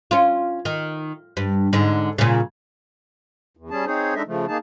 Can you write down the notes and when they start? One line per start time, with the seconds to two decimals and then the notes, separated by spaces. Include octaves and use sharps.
0.11 C#4 F4
0.65 D#3
1.37 G2
1.73 G#2 D3
2.18 A#2 C#3
3.57 E2
3.70 G3 C#4 G#4 A5
3.86 C4 D#4 G#4 C5 C#5
4.15 G#3 D4 D#4 A4 D#5 E5
4.27 C#3 F3 A3
4.48 A#3 D#4 G#4 A5